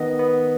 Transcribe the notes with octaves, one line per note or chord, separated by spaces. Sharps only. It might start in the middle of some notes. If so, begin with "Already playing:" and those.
Already playing: D#3 B3 D#5
B3